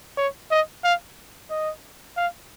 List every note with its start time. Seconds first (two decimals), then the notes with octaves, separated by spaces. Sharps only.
0.17 C#5
0.51 D#5
0.84 F5
1.50 D#5
2.17 F5